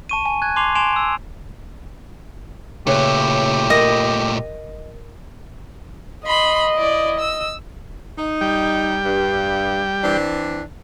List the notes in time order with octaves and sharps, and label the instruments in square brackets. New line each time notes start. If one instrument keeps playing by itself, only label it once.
[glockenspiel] A5 C#6 D#7
G#5
F#6 G#6
A5 C6 D6 G#6 C7 F7
G#5 C6 D7 E7 F7
E6
[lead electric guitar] A#2 A3 [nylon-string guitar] C#3 B4 C#5 [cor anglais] G4
[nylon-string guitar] A#4 [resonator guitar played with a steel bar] D#5
[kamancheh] D#5 [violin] B5 C6
[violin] E4 D5
E6
[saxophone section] D#4
[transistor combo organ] G3 G5
[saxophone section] G2
E3 C4 D4